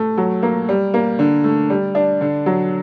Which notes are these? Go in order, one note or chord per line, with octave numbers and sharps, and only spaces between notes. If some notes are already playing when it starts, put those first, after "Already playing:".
Already playing: A3
F#3
A#3
G3
A#3
D3
A3
G3
D4
D3
F#3